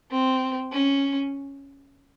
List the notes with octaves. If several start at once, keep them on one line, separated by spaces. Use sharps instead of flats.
C4
C#4